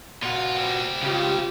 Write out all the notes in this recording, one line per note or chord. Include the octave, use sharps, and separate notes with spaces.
A#2 F4 F#4
G3 C4
C#2 C#3 F4 G4